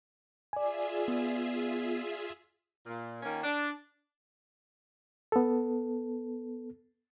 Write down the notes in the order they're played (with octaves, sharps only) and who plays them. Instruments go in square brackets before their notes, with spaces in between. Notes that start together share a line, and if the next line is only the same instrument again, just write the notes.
[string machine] F4 G#4 E5 [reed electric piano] D5 G#5
[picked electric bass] B3
[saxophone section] A#2
D#3 A#3 C#4 F4
D4
[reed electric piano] B3 A4